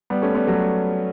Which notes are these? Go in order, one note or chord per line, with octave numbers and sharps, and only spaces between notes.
G3 B3
A3 C#4
G3 B3
F#3 A3